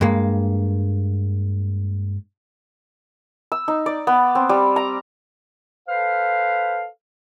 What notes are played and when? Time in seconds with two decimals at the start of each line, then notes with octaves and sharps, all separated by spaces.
0.01 G2 G#3 A#3
3.52 E6
3.68 D#4
3.86 D5
4.07 B3
4.35 C4
4.49 G3
4.76 A#5
5.88 A4 B4 C5 F5